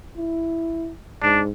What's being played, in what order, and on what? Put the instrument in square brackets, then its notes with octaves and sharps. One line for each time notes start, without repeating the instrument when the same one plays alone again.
[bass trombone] E4
[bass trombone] G#2 [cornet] D4